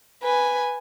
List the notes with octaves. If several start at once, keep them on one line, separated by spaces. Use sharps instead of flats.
B4 G#5